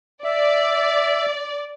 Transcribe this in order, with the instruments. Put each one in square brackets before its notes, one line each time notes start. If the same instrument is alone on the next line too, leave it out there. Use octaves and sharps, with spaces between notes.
[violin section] D5 [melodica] E5